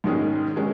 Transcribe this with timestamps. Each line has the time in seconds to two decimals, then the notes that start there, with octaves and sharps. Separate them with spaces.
0.04 G#2 D#3 G#3 C#4 G#4
0.56 D#3 G#3 C#4 G#4